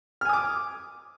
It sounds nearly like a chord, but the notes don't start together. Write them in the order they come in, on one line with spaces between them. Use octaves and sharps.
F6 G#5 D#6 D6